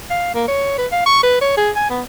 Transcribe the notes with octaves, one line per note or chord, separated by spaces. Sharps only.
F5
A#3
C#5
B4
F5
C#6
B4
C#5
G#4
G#5
B3